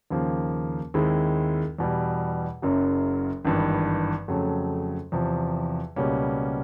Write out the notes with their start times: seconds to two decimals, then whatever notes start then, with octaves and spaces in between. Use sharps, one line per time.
0.10 D#2 C#3 F3 A#3
0.94 D#2 D#3 G#3 C4 E4
1.79 E2 B2 G3
2.62 F#1 F#2 C#3 F#3
3.45 G#1 G2 E3
4.28 F2 C#3 F#3 A3
5.12 E2 C3 F3
5.96 C#2 B2 G3 A#3 C#4